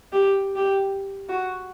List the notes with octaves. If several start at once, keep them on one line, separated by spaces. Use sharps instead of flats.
G4
G4
F#4